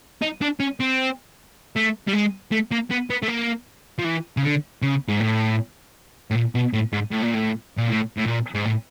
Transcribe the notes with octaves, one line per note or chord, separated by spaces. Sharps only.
D#4
D4
C#4
C4
A3
G3
G#3
A3
A#3
B3
B3
A3
A#3
F3
E3
C#3
D3
C#3
G#2
A2
A2
A#2
B2
A2
G#2
A2
A#2
A2
A#2
A2
A2
A#2
G#2
A2